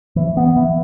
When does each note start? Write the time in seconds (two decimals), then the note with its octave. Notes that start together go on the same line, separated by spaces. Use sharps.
0.16 E3
0.37 B3
0.56 E3